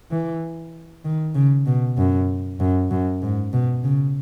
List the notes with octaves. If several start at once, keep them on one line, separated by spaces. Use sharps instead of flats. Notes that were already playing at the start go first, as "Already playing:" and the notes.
E3
D#3
C#3
B2
F#2
F#2
F#2
G#2
B2
C#3